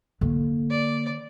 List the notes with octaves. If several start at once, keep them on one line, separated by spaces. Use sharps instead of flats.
D3 A#3
D5